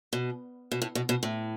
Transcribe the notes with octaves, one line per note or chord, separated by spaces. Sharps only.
B2
B2
A2
B2
B2
A2